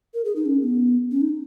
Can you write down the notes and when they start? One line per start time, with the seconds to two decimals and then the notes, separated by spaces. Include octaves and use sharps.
0.14 A#4
0.25 G#4
0.36 D#4
0.46 C#4
0.62 B3
1.11 C#4
1.21 D#4